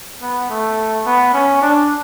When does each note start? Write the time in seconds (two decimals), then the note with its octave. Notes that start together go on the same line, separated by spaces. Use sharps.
0.22 B3
0.50 A3
1.06 B3
1.34 C#4
1.62 D4